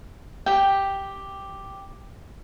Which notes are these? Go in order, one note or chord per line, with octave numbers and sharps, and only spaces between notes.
G4 G5